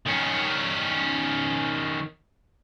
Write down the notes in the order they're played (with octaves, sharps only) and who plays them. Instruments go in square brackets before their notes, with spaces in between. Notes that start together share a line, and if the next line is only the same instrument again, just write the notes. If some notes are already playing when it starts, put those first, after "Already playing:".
[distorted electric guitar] D#3 C#4